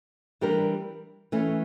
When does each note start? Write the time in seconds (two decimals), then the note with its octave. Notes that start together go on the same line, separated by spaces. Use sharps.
0.41 E3 G3 D4 G4 A#4
1.32 E3 A3 C#4